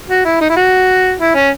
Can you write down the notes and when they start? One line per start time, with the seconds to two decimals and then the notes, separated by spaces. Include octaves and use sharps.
0.09 F#4
0.25 E4
0.40 D#4
0.50 E4
0.56 F#4
1.20 E4
1.35 C#4